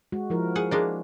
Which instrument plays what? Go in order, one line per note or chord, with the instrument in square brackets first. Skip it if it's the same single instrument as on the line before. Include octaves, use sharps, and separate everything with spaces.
[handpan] G#3 F#4
F3 E4 A#4
[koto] G#4 F#5
G#3 A#3 D4